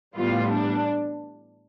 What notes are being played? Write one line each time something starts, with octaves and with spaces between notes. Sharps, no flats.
A2 E3 G3 B3 F4
D4